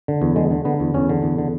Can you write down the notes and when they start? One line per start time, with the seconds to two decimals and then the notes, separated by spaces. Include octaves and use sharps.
0.08 D3
0.22 E2
0.36 D3 G#3
0.51 D3
0.65 D3 B3
0.80 E2
0.94 E2 C#4
1.09 D3
1.23 E2
1.38 D3